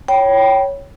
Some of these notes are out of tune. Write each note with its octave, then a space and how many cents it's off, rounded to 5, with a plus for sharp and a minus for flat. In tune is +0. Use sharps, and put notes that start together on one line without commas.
C#5 +0 G5 -15 B5 -20